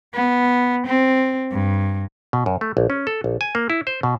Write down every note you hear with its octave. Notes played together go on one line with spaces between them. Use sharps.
B3
C4
G2
B2
F#2
A3
A#1
C#4
A4
A#1
G#5
A#3
E4
C5
B2